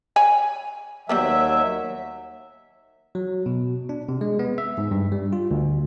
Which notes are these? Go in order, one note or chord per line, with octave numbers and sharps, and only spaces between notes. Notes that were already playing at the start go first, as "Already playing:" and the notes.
C#5 G#5 B5
D#2 F#3 G3 A#3 B3 E5
F#3
B2
D4
C3
G#3
B3
E5
G#2
G2
G3
F4
D2